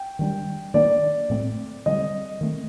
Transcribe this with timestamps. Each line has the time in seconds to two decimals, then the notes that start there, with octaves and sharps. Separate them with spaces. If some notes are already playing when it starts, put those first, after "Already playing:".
Already playing: G5
0.19 D#3 G3 D4
0.74 D#3 A#3 D4 D5
1.29 A2 A3 C4
1.86 D3 G3 C4 D#5
2.41 D#3 A3 C4